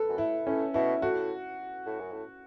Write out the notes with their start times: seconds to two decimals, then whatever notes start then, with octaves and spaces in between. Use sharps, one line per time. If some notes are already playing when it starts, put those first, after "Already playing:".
Already playing: A4 B4
0.09 F#2
0.18 A2 E4
0.46 A2 C#4
0.74 B2 E4
1.02 A2 F#4
1.86 A2
2.00 F#2
2.12 A2